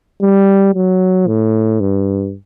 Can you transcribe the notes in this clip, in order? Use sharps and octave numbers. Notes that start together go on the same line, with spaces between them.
G3
F#3
A2
G2